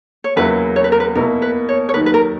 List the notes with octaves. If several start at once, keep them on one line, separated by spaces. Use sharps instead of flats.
C#5
E2 C#3 F#3 A#3 E4 B4
C#5
B4
A#4
B4
B2 A#3 E4 A#4
B4
C#5
C#5
D#2 D#3 F#3 B4
B4
A#4